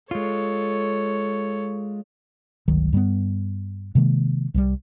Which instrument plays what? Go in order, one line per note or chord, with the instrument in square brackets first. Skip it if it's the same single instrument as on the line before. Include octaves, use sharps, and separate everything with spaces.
[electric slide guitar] G#3 F4 [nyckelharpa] A4 C#5
[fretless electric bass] G1 C#2 D#3 F#3
G2 G3 G#3 B3
C3 D#3 G#3 A#3
C2 F3 G3